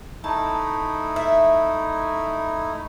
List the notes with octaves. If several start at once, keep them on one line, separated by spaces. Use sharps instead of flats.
A3 D#4 E4 A5
E5